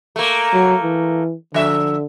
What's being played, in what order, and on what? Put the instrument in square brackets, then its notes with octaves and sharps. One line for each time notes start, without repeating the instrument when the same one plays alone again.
[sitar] A3 A#3
[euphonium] F#3
E3
[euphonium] D3 [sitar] F3 E5